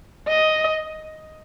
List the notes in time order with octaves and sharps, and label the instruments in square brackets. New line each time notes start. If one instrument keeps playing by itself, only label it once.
[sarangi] D#5